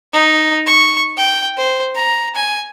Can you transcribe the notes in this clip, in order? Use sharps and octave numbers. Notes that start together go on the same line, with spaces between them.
D#4
C#6
G5
C5
A#5
G#5